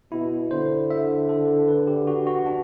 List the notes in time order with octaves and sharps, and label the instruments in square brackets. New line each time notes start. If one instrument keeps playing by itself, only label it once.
[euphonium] B2 [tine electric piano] E4
[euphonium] D3 [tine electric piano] C5
[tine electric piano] E5
A4
B4
G4
F#4
F#4
D4